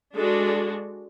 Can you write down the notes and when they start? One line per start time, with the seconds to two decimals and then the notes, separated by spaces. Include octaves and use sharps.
0.15 G#3 D4 F#4 A4